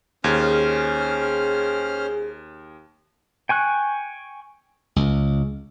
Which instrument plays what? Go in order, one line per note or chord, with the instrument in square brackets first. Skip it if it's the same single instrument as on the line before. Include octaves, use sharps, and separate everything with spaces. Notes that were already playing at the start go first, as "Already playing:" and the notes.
[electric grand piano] D#2 G#6 [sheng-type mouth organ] C#4 C5 F6 [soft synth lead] G#4
[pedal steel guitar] G5 G#5 C#6 F#6
[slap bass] C#2